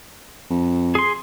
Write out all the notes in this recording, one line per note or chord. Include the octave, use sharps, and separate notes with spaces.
F2
G#4 C6